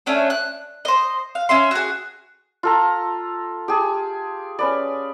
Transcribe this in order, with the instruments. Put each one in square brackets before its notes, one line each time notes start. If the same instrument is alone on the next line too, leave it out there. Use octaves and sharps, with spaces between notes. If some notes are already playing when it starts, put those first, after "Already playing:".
[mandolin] A3 C#4 D4 C#5
F#6
C5 D#5
F5
C#4 E5 C6
F#4 G#4
[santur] F4 A4 A#5
G4 G#4 A5
C#4 B4 D5